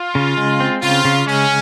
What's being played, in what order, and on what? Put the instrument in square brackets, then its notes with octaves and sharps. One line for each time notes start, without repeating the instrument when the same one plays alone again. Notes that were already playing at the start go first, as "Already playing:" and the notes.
Already playing: [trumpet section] F4
[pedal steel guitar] C#3
G#3
C4
[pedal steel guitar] C#3 [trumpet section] F4
[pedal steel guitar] C#3
[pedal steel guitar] G#3 [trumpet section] C#4